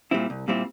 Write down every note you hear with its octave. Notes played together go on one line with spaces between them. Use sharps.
A#2 G3 C4 E4
C2
A#2 G3 C4 E4